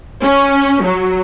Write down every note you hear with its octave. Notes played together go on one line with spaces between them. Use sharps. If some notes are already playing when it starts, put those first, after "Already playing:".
C#4
F#3